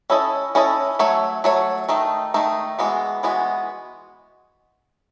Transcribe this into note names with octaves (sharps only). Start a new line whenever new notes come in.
C#4 E4 A4 D#5
C#4 E4 A4 D#5
F#3 A3 C#5
F#3 A3 C#5
D#3 A3 D#4
D#3 A3 D#4
E3 G#3 B3 F#4
E3 G#3 B3 F#4